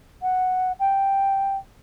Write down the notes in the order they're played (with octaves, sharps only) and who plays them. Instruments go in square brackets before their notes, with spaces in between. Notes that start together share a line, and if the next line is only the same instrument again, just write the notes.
[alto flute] F#5
G5